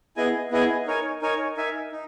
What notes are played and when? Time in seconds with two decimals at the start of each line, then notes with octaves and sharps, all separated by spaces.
0.16 B3 E4 G#4 D#5 G#5
0.51 B3 E4 G#4 D#5 G#5
0.87 D#4 A#4 C#5 G#5
1.22 D#4 A#4 C#5 G#5
1.57 D#4 A#4 E5 G#5
1.92 D#4